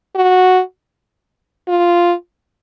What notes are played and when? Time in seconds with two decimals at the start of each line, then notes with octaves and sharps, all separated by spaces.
0.16 F#4
1.68 F4